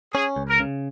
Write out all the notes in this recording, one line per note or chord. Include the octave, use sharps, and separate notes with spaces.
C#4 G#4
C#2
A#4
C#3